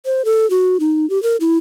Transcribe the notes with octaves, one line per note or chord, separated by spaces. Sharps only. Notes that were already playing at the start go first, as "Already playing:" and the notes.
C5
A4
F#4
D#4
G4
A#4
E4